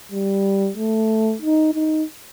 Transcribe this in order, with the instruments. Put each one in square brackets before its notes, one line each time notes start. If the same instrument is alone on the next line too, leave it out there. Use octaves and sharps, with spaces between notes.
[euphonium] G3
A3
D#4
D#4